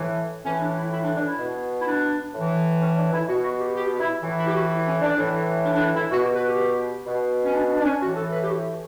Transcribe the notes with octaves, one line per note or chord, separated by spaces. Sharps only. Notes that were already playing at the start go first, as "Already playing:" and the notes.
Already playing: A2 E3
A2 E3 C#4
D4
E4
E4
D4
D4
E4
B2
E4
D4
A2 E3
C#4
D4
E4
B2 F#4
F#4
G4
G4
E4
A2 E3
E4
G4
F#4
E4
C#4
D4
A2 E3
D4
D4
E4
E4
B2 F#4
G4
B4
G4
B2
C#4
D4
D4
D4
C#4
A2 E3 F#4
A4
B4
G4
F#4